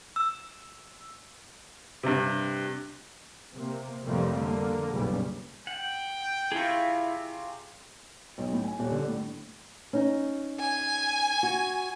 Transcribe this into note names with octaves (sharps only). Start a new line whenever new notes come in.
E6
G2 C3
C3 A#3
F2 A2 C3 G3 A#3 C4
D3 A#3
F#1 B1 A#2 C#3 G3
F#5 G5
C3 E4 F4 G#4 C#6
B1
A2
G#5
D#1
D3
A2
C#4 D#4
G#5
F#4